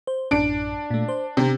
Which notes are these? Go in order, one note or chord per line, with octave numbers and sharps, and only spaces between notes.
C5
A1 F#2 D4 D7
A#2 A3
C5
C3 C4 D4 G4